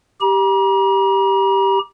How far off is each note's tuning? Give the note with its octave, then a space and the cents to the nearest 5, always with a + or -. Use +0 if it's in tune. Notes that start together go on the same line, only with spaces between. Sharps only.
G4 +0 A#5 +45